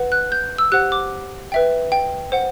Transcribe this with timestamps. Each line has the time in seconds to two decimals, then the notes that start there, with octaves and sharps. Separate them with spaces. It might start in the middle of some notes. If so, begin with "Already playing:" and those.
Already playing: B4 F#5
0.12 F#6
0.32 G6
0.58 E6
0.72 G4 C5 F#5 F#6
0.92 D6
1.52 B4 E5 G5
1.92 G5
2.32 C5 F#5